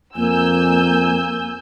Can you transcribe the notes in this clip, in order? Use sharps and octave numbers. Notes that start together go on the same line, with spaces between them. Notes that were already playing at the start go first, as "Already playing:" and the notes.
F2 A#3 G#5 E6 G6